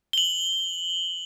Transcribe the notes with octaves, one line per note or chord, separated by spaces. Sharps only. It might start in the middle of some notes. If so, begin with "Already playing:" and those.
F#7 G7